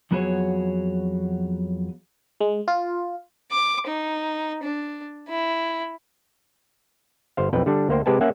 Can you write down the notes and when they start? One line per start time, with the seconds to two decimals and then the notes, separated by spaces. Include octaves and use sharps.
0.11 F2 F#3 B3 F#4 G#4 C#5
2.40 G#3
2.68 F4
3.51 D6
3.87 D#4
4.63 D4
5.28 E4
7.37 G1 C5 F5
7.53 B1 F2 B4 G5
7.66 D3 G3 D4
7.89 D2 A#3 C5 G5
8.06 C3 G#3 G4 B4 G#5 A5
8.21 A#3 C#4 E5 F#5 G#5